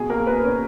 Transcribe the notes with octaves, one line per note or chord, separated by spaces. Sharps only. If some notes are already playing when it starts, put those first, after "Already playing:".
Already playing: B2 G#4
A#3 A#4
B2 B4
C#4